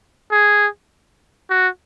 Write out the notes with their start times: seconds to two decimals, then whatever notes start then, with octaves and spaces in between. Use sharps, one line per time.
0.32 G#4
1.50 F#4